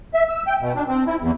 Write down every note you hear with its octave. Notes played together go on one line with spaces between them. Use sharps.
E5
E6
G5
B2
D4
C4
E4
E2